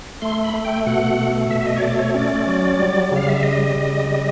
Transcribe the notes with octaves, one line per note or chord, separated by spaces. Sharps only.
A3 C6
B5
A3
G5
B2 F#5
A3
B2 E5
E5
D#5
C#5
A3 D5
C#5
C#4 D5
F#3
G3
C#3 F5
E5
G3 D#5
C#3
G3